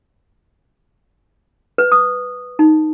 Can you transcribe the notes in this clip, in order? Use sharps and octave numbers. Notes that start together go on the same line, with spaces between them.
B4
D#6
D#4